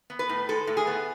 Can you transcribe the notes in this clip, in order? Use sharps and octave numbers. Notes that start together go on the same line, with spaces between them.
B3
B4
A2
G#3 A4
A2
G#4
B3